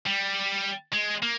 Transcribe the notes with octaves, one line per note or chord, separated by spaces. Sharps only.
G3
G#3
A#3